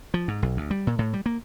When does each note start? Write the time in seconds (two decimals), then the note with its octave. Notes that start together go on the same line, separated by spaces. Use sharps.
0.14 F3
0.28 G#2
0.42 B1
0.57 D2
0.71 G3
0.87 A#2
0.99 A2
1.14 G3
1.26 A#3